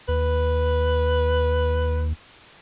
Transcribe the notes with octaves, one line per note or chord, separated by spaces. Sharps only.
D#2 B4